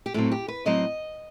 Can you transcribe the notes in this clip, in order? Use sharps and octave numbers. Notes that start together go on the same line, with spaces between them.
G4
A2 F#3 C4 A4
G4
B4
A2 F#3 C4 D#5